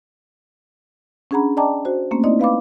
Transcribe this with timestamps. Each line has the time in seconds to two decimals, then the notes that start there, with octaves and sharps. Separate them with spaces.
1.31 C#4 D4 G#4 F#5 A#5 B5
1.57 D5 D#5 G5 A5 A#5 D6
1.85 F#4 C5
2.11 A3 A#3 C4 C#4
2.24 A#3 C4 D#4 E4 D5 D#5
2.39 B4 F5 B5 D6